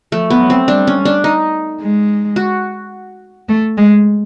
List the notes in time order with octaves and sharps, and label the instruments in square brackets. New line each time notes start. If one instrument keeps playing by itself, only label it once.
[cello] F3 [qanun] A3
[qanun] B3
[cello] F#3
[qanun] C4
[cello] G3 [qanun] D4
[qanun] C#4
D4
D#4
[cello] G#3
[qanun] F#4
[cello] A3
G#3